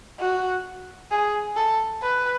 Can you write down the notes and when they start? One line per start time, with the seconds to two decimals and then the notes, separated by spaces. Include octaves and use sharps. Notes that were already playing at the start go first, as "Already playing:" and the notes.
0.20 F#4
1.11 G#4
1.57 A4
2.03 B4